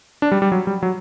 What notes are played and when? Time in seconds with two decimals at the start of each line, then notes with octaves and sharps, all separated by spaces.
0.22 D4
0.32 G3
0.42 G3
0.52 F#3
0.67 G3
0.83 F#3